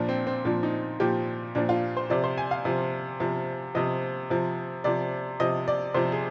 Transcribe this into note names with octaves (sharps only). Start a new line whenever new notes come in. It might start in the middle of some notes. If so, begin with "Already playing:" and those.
Already playing: A#2 F3 D4
C4
C4
A#2 F3 D4
D#4
A#2 F3 G4
A#2 F3 D4
F4
C5
C3 F3 D5
C5
G#5
F5
C3 F3
C3 F3
C3 F3 D#5
C3 F3
C3 F3 D5
C3 F3 D#5
D5
C3 F3 C5
G#4